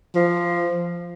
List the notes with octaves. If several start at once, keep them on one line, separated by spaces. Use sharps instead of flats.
F3